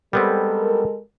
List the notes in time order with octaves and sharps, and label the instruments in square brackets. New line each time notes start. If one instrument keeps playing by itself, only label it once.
[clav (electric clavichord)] G3 B3 C4 [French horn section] G#3 A4 A#4